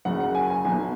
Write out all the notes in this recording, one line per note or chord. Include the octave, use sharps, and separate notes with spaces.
F#1 F#2 C#3 F#5
F#5
G#5
G#5
B1 B2 G#5